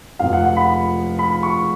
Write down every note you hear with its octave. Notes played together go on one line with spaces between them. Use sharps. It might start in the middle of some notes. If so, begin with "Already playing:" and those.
F1 F2 F3 F5
F#5
F#5
B5
B5
C#6